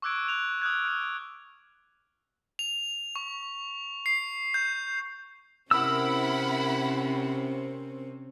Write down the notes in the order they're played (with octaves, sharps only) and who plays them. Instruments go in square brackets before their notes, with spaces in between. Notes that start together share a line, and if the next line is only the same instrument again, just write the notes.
[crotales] C#6 D6 E6 F#6 G#6 D7
F#6 F7
D#6 F6 F#6 G#6
F6 D7
F7
C#6
C7
G6
[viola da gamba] C3 C4 C#4 [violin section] E4 F#5 B5 [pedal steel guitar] A#4 E6